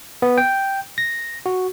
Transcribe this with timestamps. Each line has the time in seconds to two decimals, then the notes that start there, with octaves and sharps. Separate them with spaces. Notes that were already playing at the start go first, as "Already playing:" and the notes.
0.22 B3
0.38 G5
0.98 A#6
1.46 F#4